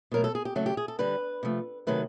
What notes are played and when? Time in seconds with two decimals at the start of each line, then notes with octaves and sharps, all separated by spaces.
0.11 B2 F#3 A3 A#4
0.24 A4
0.35 G#4
0.45 G4
0.55 C#3 F#3 A3 F#4
0.66 G4
0.77 G#4
0.88 A4
0.99 D3 G3 B4
1.43 C3 F3 A3
1.87 C3 D#3 F#3 A3 B4